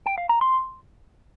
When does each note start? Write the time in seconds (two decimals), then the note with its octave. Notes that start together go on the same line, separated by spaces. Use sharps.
0.06 G5
0.18 F5
0.29 A#5
0.41 C6